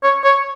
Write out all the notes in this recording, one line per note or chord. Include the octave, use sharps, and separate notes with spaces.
C#5
C#5